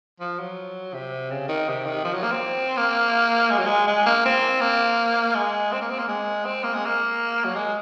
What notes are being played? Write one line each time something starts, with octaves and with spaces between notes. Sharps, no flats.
F3
F#3
C3
C#3
D#3
C3
D#3
F3
F#3
A#3
C4
A#3
G#3
F#3
G#3
G#3
A#3
C4
A#3
G#3
C4
A#3
C4
A#3
G#3
C4
A#3
G#3
A#3
F#3
G#3